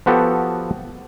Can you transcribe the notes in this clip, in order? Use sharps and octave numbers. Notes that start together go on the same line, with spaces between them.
F3 B3 F#4 G4 A4